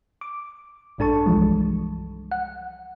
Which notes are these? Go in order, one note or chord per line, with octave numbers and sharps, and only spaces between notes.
D6
A1 G2 D4 A4 A5 C#6
C2 G2 E3 F3 G3 G#3
F#5